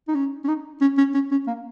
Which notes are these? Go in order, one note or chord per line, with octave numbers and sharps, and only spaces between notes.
D#4
C#4
C#4
D#4
C#4
C#4
C#4
C#4
A#3